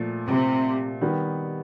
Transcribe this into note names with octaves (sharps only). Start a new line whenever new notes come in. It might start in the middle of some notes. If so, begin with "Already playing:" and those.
Already playing: A#2 F3 A3
C3
D#3 G3 B3